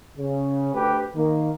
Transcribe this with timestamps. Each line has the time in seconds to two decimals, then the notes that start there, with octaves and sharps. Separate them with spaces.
0.18 C#3
0.75 D2 G4 B4
1.16 D#3 A#3